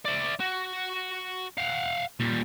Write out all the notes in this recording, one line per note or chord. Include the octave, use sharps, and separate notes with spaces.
D5 E5
F#4
F5 F#5
A#2 G3